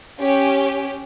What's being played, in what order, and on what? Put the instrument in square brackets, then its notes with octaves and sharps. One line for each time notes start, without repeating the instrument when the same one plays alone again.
[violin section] C#4 G4